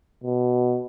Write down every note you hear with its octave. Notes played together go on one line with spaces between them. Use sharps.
B2